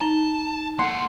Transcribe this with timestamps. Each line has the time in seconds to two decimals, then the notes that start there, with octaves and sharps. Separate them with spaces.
0.01 D#4 A5 A#5 A6 G7
0.79 A#3 A4 F#5 C6